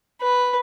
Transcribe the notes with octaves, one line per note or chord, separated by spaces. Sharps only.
B4